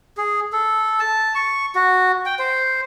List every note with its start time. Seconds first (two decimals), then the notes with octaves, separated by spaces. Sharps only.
0.17 G#4
0.53 A4
1.00 A5
1.35 C#6
1.75 F#4
2.26 G5
2.39 C5